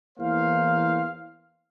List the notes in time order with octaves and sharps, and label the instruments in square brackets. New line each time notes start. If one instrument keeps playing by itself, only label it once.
[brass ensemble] E2 E3 A#3 C5 F5